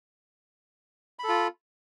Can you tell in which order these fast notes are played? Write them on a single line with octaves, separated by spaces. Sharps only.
B5 A4 F4